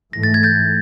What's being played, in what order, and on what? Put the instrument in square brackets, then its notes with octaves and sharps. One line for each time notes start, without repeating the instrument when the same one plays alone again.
[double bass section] G#2 E3 A3 [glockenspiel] A#6
[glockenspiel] A6
G#6
G6 A6